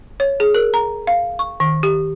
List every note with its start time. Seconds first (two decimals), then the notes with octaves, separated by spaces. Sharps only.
0.20 C#5
0.40 G#4
0.55 A#4
0.74 A#5
1.07 F5
1.39 C#6
1.60 D#3
1.83 G4